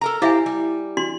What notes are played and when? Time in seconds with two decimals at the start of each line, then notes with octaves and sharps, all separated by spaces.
0.01 A4 A#4 A#5
0.22 E4 G4 C5 E5 F5 G#5
0.46 G3
0.97 D4 F#4 C6